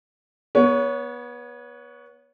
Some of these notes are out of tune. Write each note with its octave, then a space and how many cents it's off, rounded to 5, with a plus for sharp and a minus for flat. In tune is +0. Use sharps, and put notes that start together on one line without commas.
B3 -25 C#5 +15